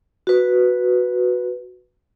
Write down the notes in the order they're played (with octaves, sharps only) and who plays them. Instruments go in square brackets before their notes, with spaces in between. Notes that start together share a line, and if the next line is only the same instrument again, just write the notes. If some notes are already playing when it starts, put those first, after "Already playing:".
[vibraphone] F#4 B4